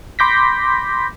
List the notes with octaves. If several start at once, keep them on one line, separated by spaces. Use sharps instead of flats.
B5 C6 D6 G6 A#6 B6